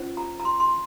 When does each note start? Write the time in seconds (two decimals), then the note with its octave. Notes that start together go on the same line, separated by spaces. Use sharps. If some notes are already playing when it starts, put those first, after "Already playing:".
Already playing: C#4 F4 C5
0.17 A#5
0.40 A#5
0.45 C6
0.60 C6